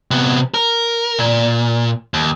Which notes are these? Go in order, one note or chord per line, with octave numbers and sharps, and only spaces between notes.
C3 B3
A#4
A#2
D#2